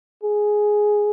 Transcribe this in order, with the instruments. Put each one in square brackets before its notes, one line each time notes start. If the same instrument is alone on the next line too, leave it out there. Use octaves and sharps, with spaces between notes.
[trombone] G#4